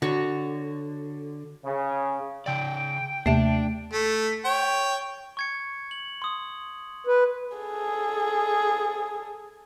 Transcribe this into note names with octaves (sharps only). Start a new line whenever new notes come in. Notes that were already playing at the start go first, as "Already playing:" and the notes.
D3 F#4 C#5
C#3
C#3 D5 G5
D#2 C3 A3 D4 E5
A3
C#5 G5
C#6 G#6 C#7
F#7
C6 D#6
B4
G#4 A4